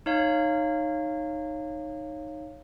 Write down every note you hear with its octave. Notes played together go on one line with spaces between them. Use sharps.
D#4 C#5 F5